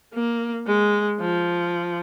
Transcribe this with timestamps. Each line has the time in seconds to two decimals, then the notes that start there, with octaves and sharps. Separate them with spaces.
0.14 A#3
0.67 G#3
1.21 F3